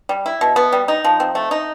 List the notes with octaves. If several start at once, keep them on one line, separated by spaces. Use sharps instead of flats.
G3
E4
B2
B3
G3
D#4
F3
C4
A3
D#4